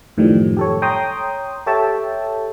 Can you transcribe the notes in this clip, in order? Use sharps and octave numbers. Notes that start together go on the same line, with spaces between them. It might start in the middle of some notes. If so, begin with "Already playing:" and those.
F#2 A2 D#3 F3 G3
G4 A4 C#5
C#5 G5 A#5 C6 D#6
G4 A4 C#5 E5 G5 A5